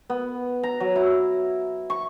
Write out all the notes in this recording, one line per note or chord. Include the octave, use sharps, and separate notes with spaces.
B3
A#5
F#3
E4
C#6